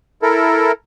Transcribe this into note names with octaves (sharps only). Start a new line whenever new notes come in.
E4 A4 A#4